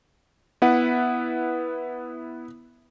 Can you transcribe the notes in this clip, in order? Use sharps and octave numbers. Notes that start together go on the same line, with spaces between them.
B3 E4 B4 F#5